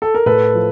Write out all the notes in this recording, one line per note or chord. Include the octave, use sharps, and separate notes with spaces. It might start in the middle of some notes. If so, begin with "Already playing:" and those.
A4
A#4
A2 A4 B4
F3